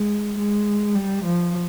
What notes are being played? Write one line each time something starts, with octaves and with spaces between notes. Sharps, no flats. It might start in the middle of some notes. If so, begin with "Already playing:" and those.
Already playing: G#3
G#3
G3
F3